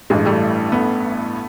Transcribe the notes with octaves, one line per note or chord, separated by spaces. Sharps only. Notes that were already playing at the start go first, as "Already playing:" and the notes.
A1 G2 E3 G#3
G3 A3
A3 B3